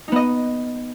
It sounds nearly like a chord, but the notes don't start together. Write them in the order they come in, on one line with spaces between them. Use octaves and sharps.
D#4 B3 D#5